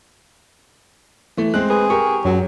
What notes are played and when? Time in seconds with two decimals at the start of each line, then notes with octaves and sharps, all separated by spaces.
1.37 E3 A3
1.54 G#3 C4 F#6
1.70 G#4 B4
1.90 G4 A#4 C#6
2.25 F#2 F#3